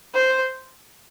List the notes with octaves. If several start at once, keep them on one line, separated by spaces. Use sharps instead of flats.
C5